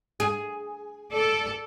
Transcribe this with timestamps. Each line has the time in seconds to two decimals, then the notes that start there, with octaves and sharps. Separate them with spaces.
0.20 G#4
1.12 A4 D5